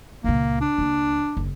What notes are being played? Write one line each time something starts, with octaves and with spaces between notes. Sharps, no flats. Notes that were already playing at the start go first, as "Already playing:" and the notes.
C#2 A#2 A#3
D4
C#2 A#3
F#1